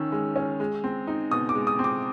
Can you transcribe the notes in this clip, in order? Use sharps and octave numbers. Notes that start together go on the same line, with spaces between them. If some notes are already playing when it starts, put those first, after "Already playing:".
Already playing: D#3 C#4 E6
G#3
C#4
G#3
C4
D#4
B2 D#6
D6
G#3
D#6
C4
D6